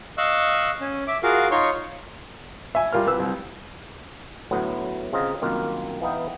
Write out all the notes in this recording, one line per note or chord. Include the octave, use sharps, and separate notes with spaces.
D#5 F5 C#6 E6 F#6
C#4
E5 D6
F4 F#4 G#4 A#4 F5
D#4 F4 C#5 C6 C#6
E5 G#5
G3 F4 A#4 F6
C2 B4 E6
C2
D2 A2 F#3 B3
C#3 C4 F4 D#5 A#5
C2 F#2 D#3 A#3 F4
E3 B3 D#4 F5 G5